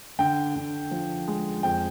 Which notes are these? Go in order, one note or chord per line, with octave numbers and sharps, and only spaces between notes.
D3 G5
D3
F3
G#3
F2 G5